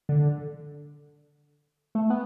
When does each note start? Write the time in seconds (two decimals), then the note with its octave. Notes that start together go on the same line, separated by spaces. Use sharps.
0.09 D3
1.95 A3
2.10 B3